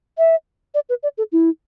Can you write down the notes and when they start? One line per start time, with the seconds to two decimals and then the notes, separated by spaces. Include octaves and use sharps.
0.18 E5
0.74 D5
0.89 B4
1.03 D5
1.18 A4
1.32 E4